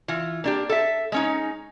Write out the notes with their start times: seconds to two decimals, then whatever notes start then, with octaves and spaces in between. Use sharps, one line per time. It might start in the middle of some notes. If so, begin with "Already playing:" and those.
0.08 E3 F4
0.44 A#3 D4 G4
0.69 A4 E5
1.12 G#3 C#4 D#4